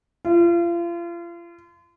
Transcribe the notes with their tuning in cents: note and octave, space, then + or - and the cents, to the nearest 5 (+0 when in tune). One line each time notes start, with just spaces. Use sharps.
F4 -35